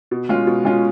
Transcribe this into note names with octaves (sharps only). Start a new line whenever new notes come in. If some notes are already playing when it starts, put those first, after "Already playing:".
B2
G#3 C#4 F4
B2
G#3 C#4 F4